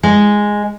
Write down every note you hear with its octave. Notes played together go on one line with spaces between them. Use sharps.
G#3